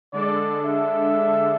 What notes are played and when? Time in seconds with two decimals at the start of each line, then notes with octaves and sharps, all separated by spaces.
0.13 D3 G#3 D4 A4 D5
0.64 E5